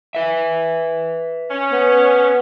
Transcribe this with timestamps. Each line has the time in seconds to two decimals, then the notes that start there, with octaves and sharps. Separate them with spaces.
0.15 B4 E5
1.50 C#4
1.73 B3